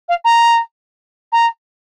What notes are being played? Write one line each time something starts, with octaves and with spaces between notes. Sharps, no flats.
F5
A#5
A#5